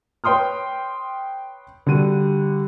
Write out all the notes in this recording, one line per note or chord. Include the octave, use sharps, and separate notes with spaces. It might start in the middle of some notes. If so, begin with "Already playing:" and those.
B4 C#5 G5 C6 D#6 F6
D3 G3 F#4 D#7